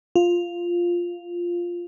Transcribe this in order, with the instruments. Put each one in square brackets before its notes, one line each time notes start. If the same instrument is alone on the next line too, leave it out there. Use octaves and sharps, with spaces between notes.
[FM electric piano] F4